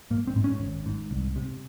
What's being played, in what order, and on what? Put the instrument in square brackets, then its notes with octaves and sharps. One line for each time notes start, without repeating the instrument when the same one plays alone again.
[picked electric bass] G#2 A#3
C4
G#2
C#4
G#1
G#2
C2
C3